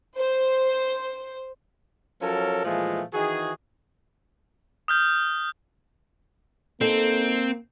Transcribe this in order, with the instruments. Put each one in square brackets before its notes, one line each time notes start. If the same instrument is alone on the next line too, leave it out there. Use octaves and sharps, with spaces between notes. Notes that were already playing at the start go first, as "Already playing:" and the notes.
[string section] C5
[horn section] F3 F#3 C#4 A4 A#4
A#2 E3 F3 G#3 A3
D#3 E3 F#4 G#4
[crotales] D#6 F6 G6
[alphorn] A#3 [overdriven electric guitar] C4 [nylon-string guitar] D#4 A4